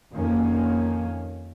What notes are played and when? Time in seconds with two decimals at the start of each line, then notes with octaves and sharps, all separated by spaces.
0.11 F2 D#3 A#3 C#4